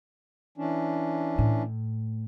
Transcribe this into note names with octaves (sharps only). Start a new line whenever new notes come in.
E3 C#4 D4
A2